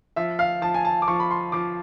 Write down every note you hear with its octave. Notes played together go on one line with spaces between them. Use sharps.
F3 E5
F5
F3 A5
G#5
A5
D6
F3 C#6
B5
C6
F3 D6